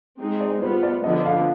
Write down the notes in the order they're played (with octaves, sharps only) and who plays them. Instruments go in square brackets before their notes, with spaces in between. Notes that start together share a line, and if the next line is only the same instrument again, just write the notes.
[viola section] G#3 C4 D#4 G#4
[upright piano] D5
[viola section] G3 B3 F4 [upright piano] C5
[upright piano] D5
[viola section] D3 F3 B3 D4 [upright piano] D#5
[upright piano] F5